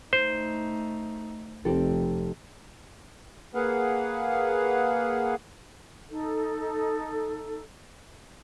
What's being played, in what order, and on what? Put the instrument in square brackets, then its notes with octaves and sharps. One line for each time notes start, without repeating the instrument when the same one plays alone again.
[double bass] A3 D#4 [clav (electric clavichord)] C5
[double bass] F1 [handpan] F3 D#4 [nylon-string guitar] C4 G4 A4
[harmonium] A#3 G#4 B4 F5 F#5
[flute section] D#4 A4